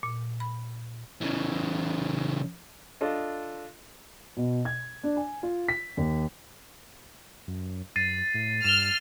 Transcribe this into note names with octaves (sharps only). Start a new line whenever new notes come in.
A#2
B5
C#3 E3
D4 F4 A4 D#5
B2
G#6
D4
G#5
F4
B6
D#2
F#2
F#2 A6 C7 D#7
A2
G2 F6 E7 G7